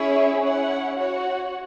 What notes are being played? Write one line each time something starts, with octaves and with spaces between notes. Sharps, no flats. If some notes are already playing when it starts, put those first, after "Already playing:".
Already playing: C#4 E4 G#4 C#5 E5
C#4 E4 C#5 F#5
F#4 C#5 F#5